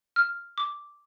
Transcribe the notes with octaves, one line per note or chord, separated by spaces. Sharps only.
F6
D6